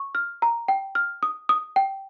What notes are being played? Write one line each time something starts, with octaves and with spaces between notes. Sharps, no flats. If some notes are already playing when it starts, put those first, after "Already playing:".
Already playing: C#6
F6
A#5
G5
F6
D#6
D#6
G5